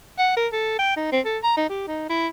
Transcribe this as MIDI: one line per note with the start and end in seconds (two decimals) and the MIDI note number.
0.18 0.32 78
0.37 0.47 70
0.52 0.76 69
0.79 0.96 79
0.96 1.10 63
1.12 1.20 60
1.25 1.38 69
1.43 1.54 82
1.57 1.67 63
1.69 1.85 67
1.87 2.09 63
2.10 2.28 64